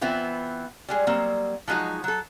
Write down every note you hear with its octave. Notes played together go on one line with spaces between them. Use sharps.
E3 B3 C4 E4 F4
G3 G#3 G#4
F#3 G3 A#3 C4
F3 F#3 G#3 D#4 F#4
F#3 A4